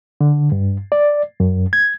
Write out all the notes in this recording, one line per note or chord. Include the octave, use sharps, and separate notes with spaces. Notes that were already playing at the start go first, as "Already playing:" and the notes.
D3
G2
D5
F#2
G#6